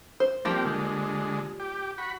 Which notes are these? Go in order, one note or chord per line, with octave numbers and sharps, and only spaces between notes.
C5
F3 G3 A#3 C4 G4
D3 G#3
G4
F#4 B5